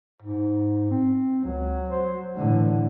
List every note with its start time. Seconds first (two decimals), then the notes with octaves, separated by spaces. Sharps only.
0.22 G#2
0.91 C4
1.45 C#2 F#3
1.88 C5
2.37 A2 D3 E3